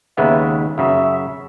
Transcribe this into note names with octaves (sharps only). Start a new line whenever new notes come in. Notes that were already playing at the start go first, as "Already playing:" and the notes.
D#2 C#3 G#3 B3 D#4 E5
F#2 C#3 F#3 E5